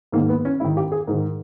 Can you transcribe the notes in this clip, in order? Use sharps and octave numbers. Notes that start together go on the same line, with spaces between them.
G#2 D#3 A#3
B3
C#4
G#2 D#3 E4
G4
G#4
G#2 D#3 A#4